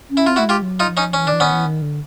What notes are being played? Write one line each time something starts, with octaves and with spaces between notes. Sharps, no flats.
C#4
E4
C4 F4
A3 E4 F#4
G#3 F4 G4
F#3
D#4 F4
F3
C#4 D#4
E3 C#4
D#3 D4
E3
D#3 B3 C#4
E3
D#3
D3